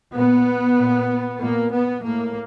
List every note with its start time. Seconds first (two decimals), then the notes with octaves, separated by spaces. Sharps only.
0.15 A#2 B3
0.77 A#2
1.40 A#2 A#3
1.72 B3
2.03 A2 A#3